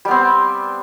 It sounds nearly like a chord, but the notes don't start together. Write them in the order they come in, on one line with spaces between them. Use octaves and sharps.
G3 B3 C4